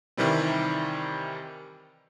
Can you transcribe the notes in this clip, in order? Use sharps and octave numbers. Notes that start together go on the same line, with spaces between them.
C3 D#3 E3 G3 C4